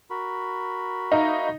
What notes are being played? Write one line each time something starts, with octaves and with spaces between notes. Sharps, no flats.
F#4 A#4 B5
D#4 E5 F5 A#5